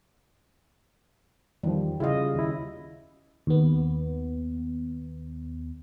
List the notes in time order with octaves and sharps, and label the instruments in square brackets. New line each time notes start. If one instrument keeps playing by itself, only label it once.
[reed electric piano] E2 D#3 F3 [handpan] G3
[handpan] C#3 D#5 [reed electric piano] E4 F4 F5
[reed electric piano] D#2 E4
[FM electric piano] D#2 B3